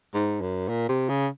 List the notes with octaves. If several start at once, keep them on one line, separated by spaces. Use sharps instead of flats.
G#2
F#2
A#2
C3
C#3